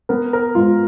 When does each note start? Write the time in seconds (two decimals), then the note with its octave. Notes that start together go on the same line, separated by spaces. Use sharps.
0.09 B3 A#4
0.33 A#4
0.55 G#2 F4